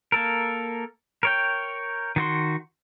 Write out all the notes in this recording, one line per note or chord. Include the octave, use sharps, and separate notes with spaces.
A#3 A4 A#4
A#4 C#5 G5
D#3 F#4 C6